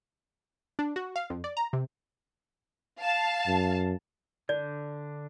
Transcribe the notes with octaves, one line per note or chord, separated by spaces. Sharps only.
D4
F#4
F5
F2
D5
A#5
C3
F5 A5
F#2
D3 D4 D5 G6